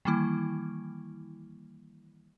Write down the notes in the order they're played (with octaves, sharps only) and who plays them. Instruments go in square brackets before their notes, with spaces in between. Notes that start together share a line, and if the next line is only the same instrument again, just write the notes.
[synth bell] D#3 E3 G3 A#3 E4